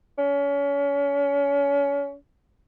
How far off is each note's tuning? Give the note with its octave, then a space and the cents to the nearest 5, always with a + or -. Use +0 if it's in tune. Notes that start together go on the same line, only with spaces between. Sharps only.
C#4 +30